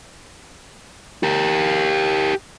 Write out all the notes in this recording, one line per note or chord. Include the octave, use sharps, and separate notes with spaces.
G4 A#4